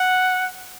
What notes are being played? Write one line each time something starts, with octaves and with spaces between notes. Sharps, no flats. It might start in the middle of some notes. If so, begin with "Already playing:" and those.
Already playing: F#5